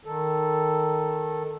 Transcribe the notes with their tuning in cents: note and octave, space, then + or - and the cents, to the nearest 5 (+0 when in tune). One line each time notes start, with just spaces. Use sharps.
D#3 +0 A4 +0